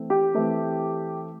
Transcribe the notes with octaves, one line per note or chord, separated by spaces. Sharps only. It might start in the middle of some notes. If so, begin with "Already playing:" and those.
Already playing: E3 A3 C4
G4
E3 A3 C4